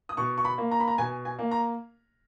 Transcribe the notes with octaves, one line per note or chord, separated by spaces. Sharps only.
D#6
B2 C#6
C#6
B5
A#3
A#5
B5
A#5
B2 G#5
G#5
A#3
A#5